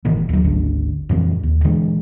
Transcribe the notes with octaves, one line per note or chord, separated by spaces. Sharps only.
G1 A#2 D#3 E3
D#2 F#3
G#1 D2 D3
F2 A#2 E3 C4
D#2
A#2 D3 E3 G#3